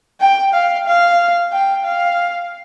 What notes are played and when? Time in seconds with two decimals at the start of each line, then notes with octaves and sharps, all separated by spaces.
0.21 G5
0.54 F5
0.86 F5
1.52 G5
1.85 F5